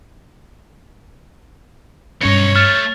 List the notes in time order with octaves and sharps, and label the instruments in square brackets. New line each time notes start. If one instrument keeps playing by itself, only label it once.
[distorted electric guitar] B1 D#4 [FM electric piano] G2 C#4 C#7 [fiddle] C#5
[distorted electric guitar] A3 B3 [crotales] F6 A6 F7